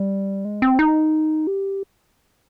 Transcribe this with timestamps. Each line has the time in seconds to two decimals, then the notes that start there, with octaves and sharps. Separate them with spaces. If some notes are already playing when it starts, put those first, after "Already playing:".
Already playing: G3
0.45 G#3
0.62 C4
0.79 D#4
1.47 G4